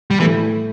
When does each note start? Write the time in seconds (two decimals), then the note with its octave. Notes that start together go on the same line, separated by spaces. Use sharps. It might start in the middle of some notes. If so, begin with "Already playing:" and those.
0.11 G3
0.19 A2 E3 A3 E4